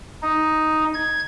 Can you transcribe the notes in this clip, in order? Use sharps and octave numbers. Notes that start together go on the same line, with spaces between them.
D#4
G#6